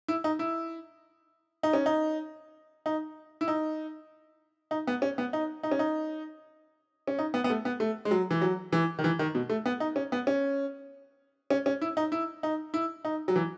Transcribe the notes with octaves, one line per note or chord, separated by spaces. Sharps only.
E4
D#4
E4
D#4
C#4
D#4
D#4
E4
D#4
D#4
B3
C#4
B3
D#4
D#4
C#4
D#4
C#4
D#4
B3
B3
A3
B3
A3
G#3
F#3
E3
F#3
E3
D#3
E3
D#3
B2
A3
B3
D#4
C#4
B3
C#4
C#4
C#4
E4
D#4
E4
D#4
E4
D#4
F#3
E3